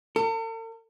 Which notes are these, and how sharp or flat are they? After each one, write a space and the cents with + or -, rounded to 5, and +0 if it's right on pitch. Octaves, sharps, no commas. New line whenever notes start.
A4 +45